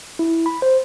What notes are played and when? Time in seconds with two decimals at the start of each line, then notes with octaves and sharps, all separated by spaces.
0.19 E4
0.46 B5
0.62 C5